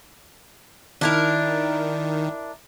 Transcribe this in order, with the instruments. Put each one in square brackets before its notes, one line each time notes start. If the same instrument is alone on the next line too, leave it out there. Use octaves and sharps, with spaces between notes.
[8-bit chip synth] D#3 [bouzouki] D4 E4 A#4